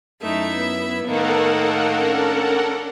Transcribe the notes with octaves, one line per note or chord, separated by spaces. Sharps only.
F#2 A3 D#4 E4 E5
B3
A2 D#3 A#3 A4 A#4 F#5
C#4 D4